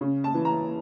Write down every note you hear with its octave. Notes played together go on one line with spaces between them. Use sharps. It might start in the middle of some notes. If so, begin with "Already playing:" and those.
C#3
A5
E3
A#5